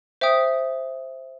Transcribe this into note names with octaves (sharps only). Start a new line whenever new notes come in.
C5 E5 G5 D#6